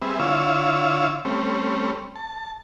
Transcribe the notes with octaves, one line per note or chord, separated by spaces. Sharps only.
G3 B3 C4 G#4 E5
D3 E4 F4 C#5 F5 E6
G3 A3 C4 C#4
A5